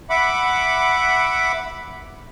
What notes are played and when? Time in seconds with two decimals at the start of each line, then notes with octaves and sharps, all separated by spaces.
0.10 E5 F#5 B5 D6